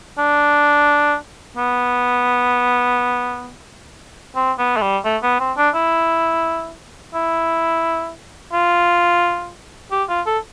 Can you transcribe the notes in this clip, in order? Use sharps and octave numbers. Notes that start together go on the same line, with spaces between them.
D4
B3
C4
B3
A3
G3
A3
B3
C4
D4
E4
E4
F4
G4
F4
A4